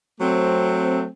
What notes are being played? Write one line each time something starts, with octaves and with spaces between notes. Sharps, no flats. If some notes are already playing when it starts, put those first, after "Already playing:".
F#3 A3 C4